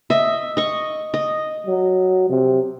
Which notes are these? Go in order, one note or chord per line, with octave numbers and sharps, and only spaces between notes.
D#5 E5
D#5 C#6
D#5
F#3
C3